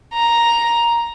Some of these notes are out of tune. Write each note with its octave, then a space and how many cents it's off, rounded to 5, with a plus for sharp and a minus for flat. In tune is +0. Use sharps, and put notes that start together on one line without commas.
A#5 +5